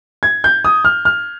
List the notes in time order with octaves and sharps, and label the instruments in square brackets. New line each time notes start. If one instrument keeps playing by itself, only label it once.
[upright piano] G#6
G6
D#6
F6
F6